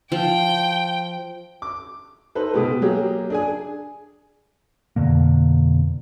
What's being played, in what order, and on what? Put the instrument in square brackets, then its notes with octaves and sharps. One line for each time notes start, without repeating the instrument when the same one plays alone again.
[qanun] F3 [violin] G5
[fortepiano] D6
D#4 A4 B4 C5
B2 G#3 G4
F#3 A#3 G4 G#4
D4 G#4 G#5
[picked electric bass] F2 B2 D3 A#3